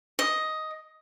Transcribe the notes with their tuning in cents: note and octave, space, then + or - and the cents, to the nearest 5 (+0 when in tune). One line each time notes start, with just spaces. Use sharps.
D#5 +10